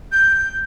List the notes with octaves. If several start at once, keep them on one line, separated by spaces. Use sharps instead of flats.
G6